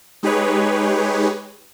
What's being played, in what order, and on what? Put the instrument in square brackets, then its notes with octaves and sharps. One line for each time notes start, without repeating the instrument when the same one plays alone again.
[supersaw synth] G#3 D#4 G4 G#4 B4 C#5